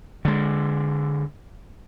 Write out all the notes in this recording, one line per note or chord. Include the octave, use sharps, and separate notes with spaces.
D3 G#3